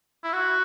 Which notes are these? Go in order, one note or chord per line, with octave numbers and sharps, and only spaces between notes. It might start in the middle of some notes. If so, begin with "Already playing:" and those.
E4
F#4